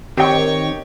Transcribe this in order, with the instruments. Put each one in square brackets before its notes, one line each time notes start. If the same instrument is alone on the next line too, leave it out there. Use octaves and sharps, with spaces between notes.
[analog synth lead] D#3 [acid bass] C4 [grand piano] G4 D#5 G5 [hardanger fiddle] C#5 C#6